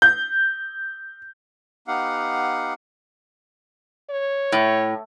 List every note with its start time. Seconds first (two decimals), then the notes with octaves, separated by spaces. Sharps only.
0.02 G6
1.88 B3 D#4 G4 F5 F#5
4.10 C#5
4.52 A2